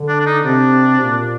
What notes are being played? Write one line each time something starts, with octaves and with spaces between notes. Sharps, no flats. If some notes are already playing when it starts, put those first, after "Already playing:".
Already playing: D3
D4
D4
D#4
C3 D4
A#2